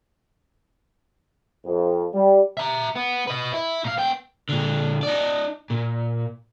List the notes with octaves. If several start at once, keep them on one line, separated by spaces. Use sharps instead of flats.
F2
G3
E5 A#5
B3
B4 D#5
E4
A#2 F5
B3 G5
A#2 D3
D#4 D5
A#2